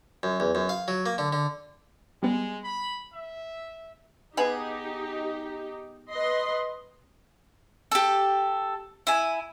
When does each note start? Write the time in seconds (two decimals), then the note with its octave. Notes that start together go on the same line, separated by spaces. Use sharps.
0.23 F#2
0.40 E2
0.55 F#2
0.69 F5
0.88 F#3
1.06 A#3
1.18 D3
1.33 D3
2.23 G3 G#3 B3
2.64 B5
3.13 E5
4.37 B3 D#4 G4 G#4
6.10 B4 D#5 C6
7.92 G4 A4
9.07 E4 G#5